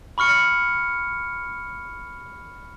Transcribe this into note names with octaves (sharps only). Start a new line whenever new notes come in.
B5 C#6 F6 C#7